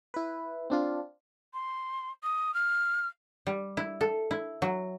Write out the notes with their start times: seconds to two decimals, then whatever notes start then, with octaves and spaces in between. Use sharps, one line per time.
0.14 E4 B4
0.70 C4 D4 F4
1.54 C6
2.23 D#6
2.54 F6
3.47 G3
3.77 E4
4.01 A4
4.31 E4
4.62 F#3